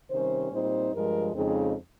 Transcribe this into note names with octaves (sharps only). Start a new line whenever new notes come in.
C3 D#3 G3 C#4 C5
A#2 G3 C4 D#4 C5
G2 F3 G#3 A#4
F2 C#3 G#3 C4 D#4 G#4